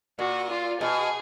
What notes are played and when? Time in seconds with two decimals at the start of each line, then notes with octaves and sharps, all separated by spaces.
0.19 A#2 F#4
0.50 F4
0.80 B2 G#4